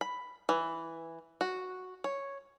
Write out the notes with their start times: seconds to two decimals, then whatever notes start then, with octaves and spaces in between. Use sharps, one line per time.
0.01 B5
0.49 E3
1.41 F#4
2.04 C#5